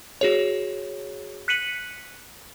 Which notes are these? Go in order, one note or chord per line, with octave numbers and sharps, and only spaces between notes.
F#4 G#4 C#5
F#6 B6 C#7 D#7 F#7